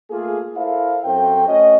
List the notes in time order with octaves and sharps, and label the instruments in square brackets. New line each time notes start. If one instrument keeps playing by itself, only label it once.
[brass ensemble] A3 A#3 F4 G#4
E4 A4 A#4 C5 E5 F5
F#2 C4 F#4 A4 C5 G5
A3 C#4 F#4 D#5